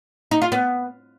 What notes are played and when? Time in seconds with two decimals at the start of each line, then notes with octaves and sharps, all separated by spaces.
0.31 D#4
0.42 F4
0.52 B3